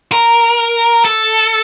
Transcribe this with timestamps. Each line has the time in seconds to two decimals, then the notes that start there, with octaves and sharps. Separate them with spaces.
0.12 A#4
1.05 A4